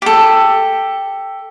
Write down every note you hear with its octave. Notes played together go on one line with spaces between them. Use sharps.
G4 A4